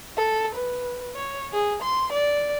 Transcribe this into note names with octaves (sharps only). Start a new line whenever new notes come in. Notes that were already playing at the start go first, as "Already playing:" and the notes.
A4
B4
C#5
G#4
C6
D5